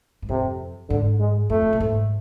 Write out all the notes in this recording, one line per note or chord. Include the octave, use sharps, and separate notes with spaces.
G#2
F2 C3
G#2 D3
G#3
F2 A3
A2
G#2